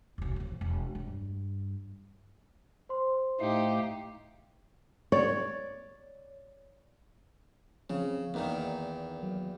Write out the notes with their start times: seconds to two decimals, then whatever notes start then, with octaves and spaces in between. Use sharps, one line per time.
0.18 D#1 B1
0.36 D3 F3
0.61 E1
0.95 G2
2.89 C5 C6
3.40 A2 A3 D#4 G4 F5
5.12 C#5 D5
7.90 C#3 F3 C4 C#4
8.34 E2 A#2 D#3 A#3 D#4 A#4
9.23 F#3